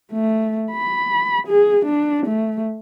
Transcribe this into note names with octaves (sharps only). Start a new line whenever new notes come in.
A3
B5
G#4
D4
A3